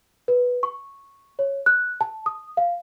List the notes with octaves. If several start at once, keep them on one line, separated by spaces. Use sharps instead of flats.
B4
C#6
C#5
F#6
A5
D#6
F5